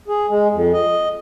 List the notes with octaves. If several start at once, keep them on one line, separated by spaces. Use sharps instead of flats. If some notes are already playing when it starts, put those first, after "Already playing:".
G#4
G#3
F2
D#5